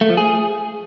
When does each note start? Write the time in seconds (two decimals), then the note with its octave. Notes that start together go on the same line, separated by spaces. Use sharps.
0.01 A3
0.09 F3
0.17 G#4